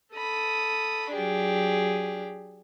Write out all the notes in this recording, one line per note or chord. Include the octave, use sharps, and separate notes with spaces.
A4 B5 D#6
F#3 D4 G4 G#4